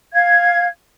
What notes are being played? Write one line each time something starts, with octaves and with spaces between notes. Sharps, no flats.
F5 G#6